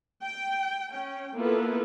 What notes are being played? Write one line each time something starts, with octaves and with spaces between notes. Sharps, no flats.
G5
C#4 G5
A#3 B3 E4 F4 A4 B4